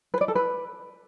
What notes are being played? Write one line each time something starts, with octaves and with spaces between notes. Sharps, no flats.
B4
D5
A4
B4